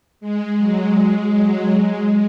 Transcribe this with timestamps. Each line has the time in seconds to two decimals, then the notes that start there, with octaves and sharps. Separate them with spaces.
0.20 G#3
0.58 F#3
0.96 G#3
1.34 F#3
1.71 G#3